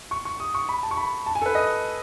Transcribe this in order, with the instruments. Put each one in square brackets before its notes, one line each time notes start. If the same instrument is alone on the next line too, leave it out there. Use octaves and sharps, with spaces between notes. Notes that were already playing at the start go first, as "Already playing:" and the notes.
[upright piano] C#6
C#6
D#6
C#6
B5
A5
C#6
B5
A5
G#5
A4
B4
D#5